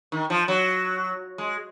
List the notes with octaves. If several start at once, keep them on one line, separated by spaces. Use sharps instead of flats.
D#3
F3
F#3
G#3